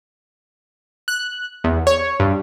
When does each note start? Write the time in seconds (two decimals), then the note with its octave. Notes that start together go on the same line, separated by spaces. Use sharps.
1.08 F#6
1.64 E2
1.87 C#5
2.20 G2